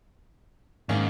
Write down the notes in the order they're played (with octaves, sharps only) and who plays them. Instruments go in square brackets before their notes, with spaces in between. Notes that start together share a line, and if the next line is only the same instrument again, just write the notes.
[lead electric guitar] G#2 [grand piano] D#3 A#3 C#4